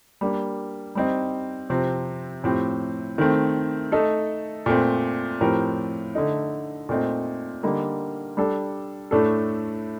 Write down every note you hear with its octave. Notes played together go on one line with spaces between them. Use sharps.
G3 A#3 D4
G3 C4 D#4
C3 F3 C4
A2 F3 C4 G4
D#3 A3 C4
A3 D#4 A4
A#2 A3 C4
A2 F3 C4 G4 A#4
D3 A3 D#4
A#2 A3 C4 D#4
D3 G3 A#3 D#4
G3 D4 A4
A2 A3 D4 A4